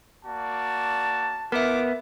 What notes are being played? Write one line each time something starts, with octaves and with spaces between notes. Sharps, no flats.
A#3 F#4 D5 A5
B3 E4 F4 A#4 E5 D6